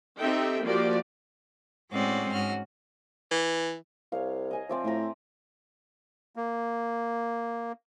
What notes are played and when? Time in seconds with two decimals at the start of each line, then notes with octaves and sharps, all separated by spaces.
0.19 C4 D#4 G4 A4 E5 G5
0.62 F3 A#3 F#4 G4 D5
1.92 A2 G#3 C4 C#4 F#4 D5
2.32 G#2 C#4 F#4 F6
3.31 E3
4.12 C2 C#5 F5
4.51 D#5 G#5 A#5
4.69 F3 C4 D5 E5
4.84 A2 E5 A#5
6.36 A#3